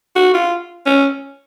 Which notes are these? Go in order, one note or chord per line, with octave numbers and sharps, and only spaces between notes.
F#4
F4
C#4